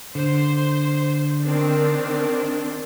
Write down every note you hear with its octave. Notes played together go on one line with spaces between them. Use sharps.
D3 C5
D#3 C4 D4